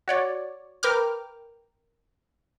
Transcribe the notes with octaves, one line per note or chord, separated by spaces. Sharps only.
F#4 C#5 D5
A#4 B4 G5 D6 F6